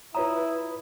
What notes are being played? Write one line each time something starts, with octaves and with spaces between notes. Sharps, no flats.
E4 F4 B4 C#5 A#5 B5 D#6